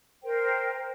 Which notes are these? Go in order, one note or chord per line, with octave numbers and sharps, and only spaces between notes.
A#4 C5 G5